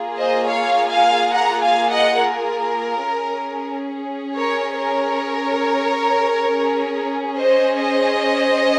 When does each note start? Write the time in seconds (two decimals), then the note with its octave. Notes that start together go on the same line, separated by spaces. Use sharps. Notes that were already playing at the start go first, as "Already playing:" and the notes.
Already playing: A#3 F4 G#4
0.19 C5 D#5
0.48 C#5 F5
0.90 F5 G#5
1.34 F#5 A#5
1.62 F5 G#5
1.91 D#5 F#5
2.20 A#4
3.07 C#4 G#4
4.35 A#4 C#5
4.78 A#4 C#5
6.51 C#4 G#4
7.37 C5 D#5
7.80 C5 D#5